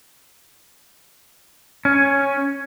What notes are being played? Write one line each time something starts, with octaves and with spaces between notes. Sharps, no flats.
C#4